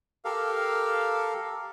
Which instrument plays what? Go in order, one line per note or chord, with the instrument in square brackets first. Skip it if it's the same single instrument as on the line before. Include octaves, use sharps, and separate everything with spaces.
[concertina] G4 A4 A#4 F5